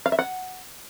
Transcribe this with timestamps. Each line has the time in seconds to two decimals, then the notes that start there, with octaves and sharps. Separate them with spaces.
0.06 F5
0.12 E5
0.19 F#5